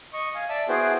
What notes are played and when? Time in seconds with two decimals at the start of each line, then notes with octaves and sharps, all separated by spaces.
0.13 D#5 C#6
0.35 F5 G#5
0.49 D5 E5 A5 E6
0.68 B3 E4 F#4 G#4 C5 G5